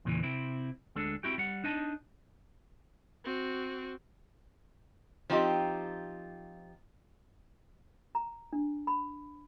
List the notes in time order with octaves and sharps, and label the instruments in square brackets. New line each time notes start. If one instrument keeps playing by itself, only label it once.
[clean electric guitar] E2 A#2 C#3 E3
C3 C4 E4
D2 G#3 D4 A4
C4 E4 F#4 G4 G5
G3 F#5
D4 D#4 D#5 A5
[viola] C4 F#4
[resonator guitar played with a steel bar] F3 C4 D#4 F4 G4
[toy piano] A#5
D4
B5